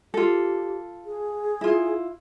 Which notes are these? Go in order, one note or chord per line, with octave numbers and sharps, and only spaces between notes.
F4 G4 A4
G#4
E4 F4